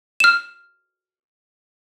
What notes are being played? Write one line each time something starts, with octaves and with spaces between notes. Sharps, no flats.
F6 E7